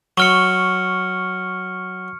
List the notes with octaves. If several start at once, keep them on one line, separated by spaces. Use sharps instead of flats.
F#3 C#6 F6 C#7